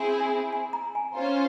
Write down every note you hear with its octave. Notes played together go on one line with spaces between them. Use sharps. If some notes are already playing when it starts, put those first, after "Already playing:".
Already playing: C4 E4 G#4
G#5
G#5
A#5
G#5
C#4 F4 C5